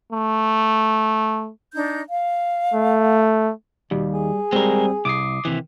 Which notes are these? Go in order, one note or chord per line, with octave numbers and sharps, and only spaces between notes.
A3
D4 D#4 G6
F5
A3
D#2 B2 G3
G#4
G3 G#3 C4 A#4
C2 D6 D#6 C7
C3 D#3 E3